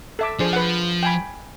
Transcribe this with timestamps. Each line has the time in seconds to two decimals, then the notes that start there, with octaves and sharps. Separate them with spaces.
0.19 A4 E5 D6
0.39 F3 D4 G#4 C5
0.53 B4 F#5
1.03 G5 G#5 B5